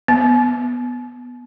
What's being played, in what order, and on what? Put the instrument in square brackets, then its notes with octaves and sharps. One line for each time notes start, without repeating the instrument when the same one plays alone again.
[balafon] B3